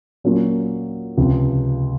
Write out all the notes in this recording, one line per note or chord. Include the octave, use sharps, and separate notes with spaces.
A#2 F#3 A#3 C#4 F4
C#2 C3 F3